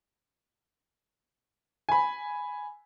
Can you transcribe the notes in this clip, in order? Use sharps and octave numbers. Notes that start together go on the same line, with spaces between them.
G#5 B5